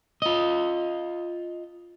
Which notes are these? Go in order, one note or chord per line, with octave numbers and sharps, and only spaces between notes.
F4 D#5